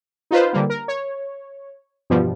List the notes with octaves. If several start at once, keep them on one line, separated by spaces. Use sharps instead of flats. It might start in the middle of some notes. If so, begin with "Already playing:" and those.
D#4 F4 B4 C5
D3 G3 A#3
A#4
C#5
E2 G2 B2 F3 G3